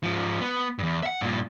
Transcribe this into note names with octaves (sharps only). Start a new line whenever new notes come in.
G#2 F3
B3
E2 G2
E5 F#5
G2 A#2